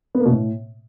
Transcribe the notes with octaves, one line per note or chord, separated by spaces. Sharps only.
B3
A#3
B2
A2